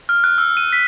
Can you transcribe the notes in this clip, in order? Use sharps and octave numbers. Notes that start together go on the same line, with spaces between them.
F6
F#6
E6
D#7
B6